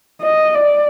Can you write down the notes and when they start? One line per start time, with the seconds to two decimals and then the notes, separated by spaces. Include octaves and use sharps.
0.22 D#5
0.55 D5